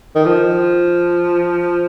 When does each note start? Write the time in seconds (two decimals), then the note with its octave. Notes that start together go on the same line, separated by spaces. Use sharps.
0.15 D#3
0.26 F3